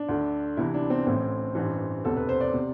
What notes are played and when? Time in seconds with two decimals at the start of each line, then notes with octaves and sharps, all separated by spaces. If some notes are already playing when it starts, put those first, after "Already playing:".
Already playing: D4
0.09 D2 D3
0.57 C2 C3 E3 E4
0.74 D4
0.90 C4
1.06 A1 A2 E3 C4
1.55 A1 G2 E3
2.04 E1 D2 C3 A4
2.16 B4
2.29 C5
2.41 D5
2.53 C3